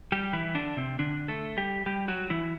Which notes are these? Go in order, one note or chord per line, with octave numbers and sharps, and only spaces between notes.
G3 G4
E3 E4
D3 D4
C3 C4
D3 D4
A3 A4
G3 G4
G3 G4
F#3 F#4
E3 E4